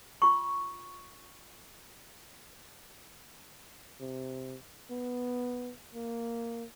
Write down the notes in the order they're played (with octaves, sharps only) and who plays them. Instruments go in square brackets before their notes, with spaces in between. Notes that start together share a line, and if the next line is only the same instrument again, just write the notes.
[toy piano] F4 C#6
[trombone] C3
B3
A#3